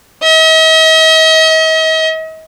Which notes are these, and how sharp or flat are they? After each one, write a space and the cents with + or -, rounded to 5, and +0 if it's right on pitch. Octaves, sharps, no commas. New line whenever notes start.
D#5 +45